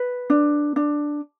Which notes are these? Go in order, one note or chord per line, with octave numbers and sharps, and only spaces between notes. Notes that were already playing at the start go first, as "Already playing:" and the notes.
Already playing: B4
D4
D4